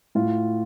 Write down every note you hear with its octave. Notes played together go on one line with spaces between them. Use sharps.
A2 F4